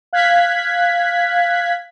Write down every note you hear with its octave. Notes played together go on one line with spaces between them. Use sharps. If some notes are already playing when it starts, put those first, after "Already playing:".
F5 F#6 G#6 B6